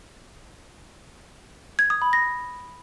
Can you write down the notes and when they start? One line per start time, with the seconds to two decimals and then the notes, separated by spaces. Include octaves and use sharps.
1.79 G#6
1.90 D#6
2.02 B5
2.13 A#6